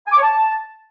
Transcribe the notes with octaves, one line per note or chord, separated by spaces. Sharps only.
G#5
D6
C#5
A5